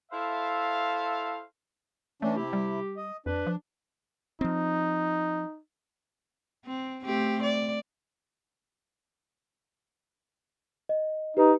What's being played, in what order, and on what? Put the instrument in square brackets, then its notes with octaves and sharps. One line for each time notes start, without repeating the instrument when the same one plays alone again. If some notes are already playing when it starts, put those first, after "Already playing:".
[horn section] E4 A4 C5 E5 F5
[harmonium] E3 C#4 D4 [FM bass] A3
[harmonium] C3 E4 [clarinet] G4
[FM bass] G3
[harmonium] D#5
[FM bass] F2 [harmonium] D4 [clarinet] B4
[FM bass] F3
[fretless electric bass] F3 C4 [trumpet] D#4
[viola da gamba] C4
A3 C4 G4
D5
[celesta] D#5
[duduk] D#4 [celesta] G4 B4